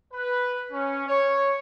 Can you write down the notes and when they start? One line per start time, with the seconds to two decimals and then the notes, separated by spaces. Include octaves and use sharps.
0.13 B4
0.72 C#4
1.07 C#5